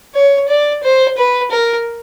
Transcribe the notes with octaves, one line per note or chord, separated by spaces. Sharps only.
C#5
D5
C5
B4
A#4